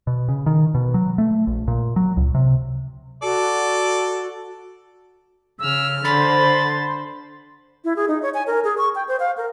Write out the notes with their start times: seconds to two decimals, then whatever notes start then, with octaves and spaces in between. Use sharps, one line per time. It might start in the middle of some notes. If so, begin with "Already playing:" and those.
0.07 B2
0.29 C#3
0.46 D#3
0.75 B2
0.94 F#3
1.18 A3
1.47 A#1
1.68 A#2
1.96 F#3
2.17 C#2
2.35 C3
3.23 F#4 A4 D5
5.59 C#3 E6 F6
6.04 D3 C5 B5 A6
7.85 E4
7.96 G#4
8.08 D#4
8.22 C#5
8.34 G#5
8.47 A#4
8.64 G#4
8.78 C#6
8.95 G5
9.08 C5
9.20 F5
9.37 A#4